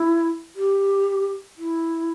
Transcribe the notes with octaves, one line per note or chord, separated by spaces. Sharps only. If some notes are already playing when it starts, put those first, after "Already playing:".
Already playing: E4
G4
E4